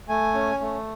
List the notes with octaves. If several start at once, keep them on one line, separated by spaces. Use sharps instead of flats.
A3 G#5
C#4
A3